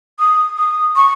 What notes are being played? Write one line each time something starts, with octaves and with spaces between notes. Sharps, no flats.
D#6
D#6
C#6